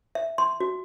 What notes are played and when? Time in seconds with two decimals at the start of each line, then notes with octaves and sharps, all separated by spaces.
0.15 E5
0.38 C6
0.60 F#4